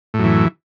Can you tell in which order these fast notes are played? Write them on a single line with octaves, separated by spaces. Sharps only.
A2 F#2 E3